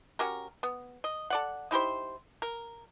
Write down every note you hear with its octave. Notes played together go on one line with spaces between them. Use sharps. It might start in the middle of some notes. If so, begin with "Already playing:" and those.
C#4 F#4 G4 A#4
B3
D#5
A4 D5 F#5
D#4 E4 G4 C5
A#4